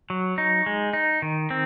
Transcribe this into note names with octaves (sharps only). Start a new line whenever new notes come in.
F#3
D#4
G#3
D#4
D#3
C4